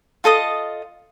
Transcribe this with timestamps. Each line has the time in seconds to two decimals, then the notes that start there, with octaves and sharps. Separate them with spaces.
0.24 F4 A4 D#5 D#6